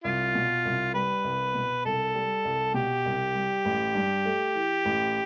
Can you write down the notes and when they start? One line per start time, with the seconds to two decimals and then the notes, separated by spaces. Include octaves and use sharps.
0.04 C2 F4
0.35 B2
0.65 C2
0.94 G3 B4
1.24 C2
1.55 B2
1.85 C2 A4
2.14 G3
2.45 C2
2.74 B2 G4
3.05 C2
3.35 G3
3.65 A1
3.95 G2
4.26 A3
4.55 E3
4.85 A1